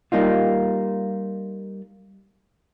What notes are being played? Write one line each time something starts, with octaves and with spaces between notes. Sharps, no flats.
G3 A#3 D#4 F4